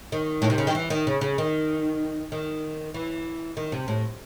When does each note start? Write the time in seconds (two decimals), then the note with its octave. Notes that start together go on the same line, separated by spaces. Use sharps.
0.12 D#3
0.42 A2
0.50 C3
0.58 C#3
0.67 D#3
0.75 E3
0.90 D#3
1.07 C#3
1.21 C#3
1.38 D#3
2.32 D#3
2.94 E3
3.57 D#3
3.72 C3
3.88 A2